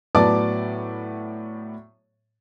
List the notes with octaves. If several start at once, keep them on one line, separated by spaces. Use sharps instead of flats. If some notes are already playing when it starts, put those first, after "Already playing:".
A2 F#3 B3 D5 A5 D6